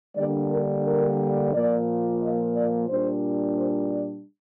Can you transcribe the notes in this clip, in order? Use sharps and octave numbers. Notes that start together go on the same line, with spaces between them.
D3 G3 A#3 D4 D5
A#4
A#4
A#2 F3 A#3 D5
D#5
D5
A#2 G3 D4 C5
C5
D5